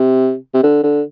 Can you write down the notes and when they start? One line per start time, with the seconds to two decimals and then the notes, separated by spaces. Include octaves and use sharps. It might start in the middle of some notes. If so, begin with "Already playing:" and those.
Already playing: C3
0.54 C3
0.63 D3
0.83 D3